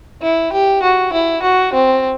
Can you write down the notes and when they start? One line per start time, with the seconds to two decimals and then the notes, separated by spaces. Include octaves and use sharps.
0.22 E4
0.52 G4
0.82 F#4
1.13 E4
1.42 F#4
1.73 C4